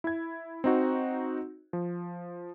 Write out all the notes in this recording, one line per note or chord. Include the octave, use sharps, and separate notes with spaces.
E4 G#6
C4 D#4 F#4
F3